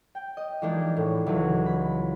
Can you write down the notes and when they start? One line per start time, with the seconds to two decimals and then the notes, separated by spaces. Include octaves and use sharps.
0.15 G5
0.37 D#5
0.62 E3 F3 G#3 A#3 D4 D#4
0.97 A2
1.26 C#2 D#3 E3 F#3
1.66 B5